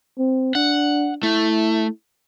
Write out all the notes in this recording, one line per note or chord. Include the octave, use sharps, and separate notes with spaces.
C4
D4 F#5
A3 E4